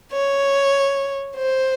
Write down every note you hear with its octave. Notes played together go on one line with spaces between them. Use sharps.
C#5
C5